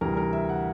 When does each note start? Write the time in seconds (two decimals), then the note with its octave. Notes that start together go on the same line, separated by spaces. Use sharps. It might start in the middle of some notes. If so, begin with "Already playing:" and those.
0.01 D2 C3 E3 G3 A#4
0.17 A#4
0.33 E5
0.49 F#5